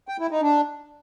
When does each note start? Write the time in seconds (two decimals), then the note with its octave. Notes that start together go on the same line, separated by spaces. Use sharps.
0.08 G5
0.20 E4
0.31 D#4
0.42 D4